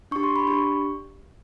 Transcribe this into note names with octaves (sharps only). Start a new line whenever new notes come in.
D4 G4 C#6
C6
B5
D4 G4 C#6